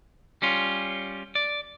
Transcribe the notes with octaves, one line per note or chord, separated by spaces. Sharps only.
G3 C#4 F4
D5